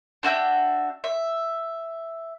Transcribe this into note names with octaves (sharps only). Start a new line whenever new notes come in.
D4 F#4 E5 G5
E5